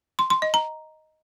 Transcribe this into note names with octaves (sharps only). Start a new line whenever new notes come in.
C6
C6
D#5
A#5